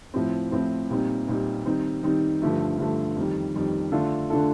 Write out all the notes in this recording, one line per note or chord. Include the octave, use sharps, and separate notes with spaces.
A2 F3 C4
A2 F3 C4
A#2 G3 C4 D#4
A#2 G3 C4 D#4
D#3 G3 C4 D#4
D#3 G3 C4 D#4
G2 D3 F3 A3
G2 D3 F3 A3
F2 D#3 G3
F2 D#3 G3
D3 A3 D4 F4 A4
D3 A3 D4 F4 A4